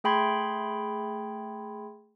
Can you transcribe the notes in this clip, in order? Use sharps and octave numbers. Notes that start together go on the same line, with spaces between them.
A3 G#4 G5 B5 C6 G#6